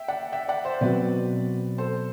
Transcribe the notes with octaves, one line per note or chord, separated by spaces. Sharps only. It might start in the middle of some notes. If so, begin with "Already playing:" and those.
Already playing: E5 G5
D5 F#5
E5 G5
D5 F#5
C5 E5
B2 F#3 C4 F#4 B4 D5
A4 C5